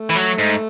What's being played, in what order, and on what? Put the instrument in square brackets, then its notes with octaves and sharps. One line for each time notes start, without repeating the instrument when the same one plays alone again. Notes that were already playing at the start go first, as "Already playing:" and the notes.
Already playing: [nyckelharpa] A3
[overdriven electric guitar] E3
F#3
G#2